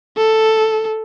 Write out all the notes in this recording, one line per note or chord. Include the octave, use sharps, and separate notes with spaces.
A4